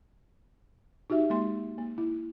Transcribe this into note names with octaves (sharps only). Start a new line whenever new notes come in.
D#4 F#4 G4 E5
G#3 A#3 C6
A#3
E4